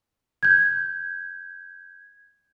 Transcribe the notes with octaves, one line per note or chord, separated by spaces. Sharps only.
G6 G#6